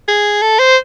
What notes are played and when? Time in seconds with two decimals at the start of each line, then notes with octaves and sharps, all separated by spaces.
0.08 G#4
0.42 A4
0.59 C5